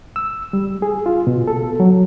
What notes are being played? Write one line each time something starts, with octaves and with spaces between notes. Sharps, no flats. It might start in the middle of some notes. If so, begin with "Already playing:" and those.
E6
G3
G#4
F4
B2
A4
F#3